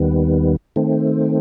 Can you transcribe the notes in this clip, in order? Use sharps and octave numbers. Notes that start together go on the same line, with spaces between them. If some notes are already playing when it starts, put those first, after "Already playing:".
Already playing: D#2 D#3 G3 B3
D#3 A3 C4